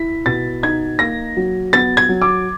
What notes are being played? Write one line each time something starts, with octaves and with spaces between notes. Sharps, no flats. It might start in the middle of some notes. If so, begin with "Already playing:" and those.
Already playing: E4 B6
B2 A6
D#4 G#6
A#3 A#6
F#3
B3 A6
G#6
F#3
D6